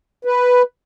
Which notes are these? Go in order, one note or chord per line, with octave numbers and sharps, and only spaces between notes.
B4